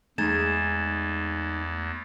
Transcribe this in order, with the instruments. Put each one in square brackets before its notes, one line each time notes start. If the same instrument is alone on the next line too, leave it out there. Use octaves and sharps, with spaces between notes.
[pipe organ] E2 [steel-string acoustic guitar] G#3 D#4 G#5 [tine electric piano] A3 [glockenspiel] G#6 A6 E7